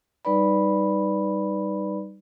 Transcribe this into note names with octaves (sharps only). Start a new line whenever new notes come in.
G3 D#4 B4 D5 B5